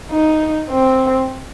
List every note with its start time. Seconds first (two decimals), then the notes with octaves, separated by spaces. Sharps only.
0.11 D#4
0.70 C4